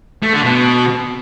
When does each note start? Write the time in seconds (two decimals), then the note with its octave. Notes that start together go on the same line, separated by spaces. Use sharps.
0.23 A3
0.33 D3
0.44 B2